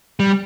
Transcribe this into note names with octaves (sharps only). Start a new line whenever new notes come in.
G3